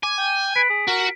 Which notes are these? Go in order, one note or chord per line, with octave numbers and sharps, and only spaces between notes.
G#5 D6
G5
B4 B6 D7
G#4
F#4 A#4